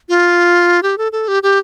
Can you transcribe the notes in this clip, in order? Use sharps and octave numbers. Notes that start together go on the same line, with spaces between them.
F4
G4
A4
A4
G4
G4